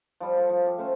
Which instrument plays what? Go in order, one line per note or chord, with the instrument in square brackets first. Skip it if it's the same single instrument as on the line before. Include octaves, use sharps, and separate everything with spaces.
[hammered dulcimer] F3 G3
G3 F4 A4
F3
G4
A3 C#4 G4 C5